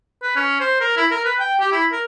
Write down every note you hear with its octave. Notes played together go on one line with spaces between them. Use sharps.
B4
C#4
C5
A#4
E4
A#4
B4
G5
G4
E4
A#4